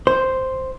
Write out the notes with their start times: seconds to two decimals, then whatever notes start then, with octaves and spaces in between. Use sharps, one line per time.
0.07 C5